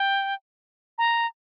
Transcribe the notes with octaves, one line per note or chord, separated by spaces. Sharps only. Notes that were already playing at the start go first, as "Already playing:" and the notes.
Already playing: G5
A#5